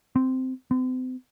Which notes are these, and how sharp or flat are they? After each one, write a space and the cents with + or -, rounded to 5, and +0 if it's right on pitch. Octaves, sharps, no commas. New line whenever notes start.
C4 -10
C4 -40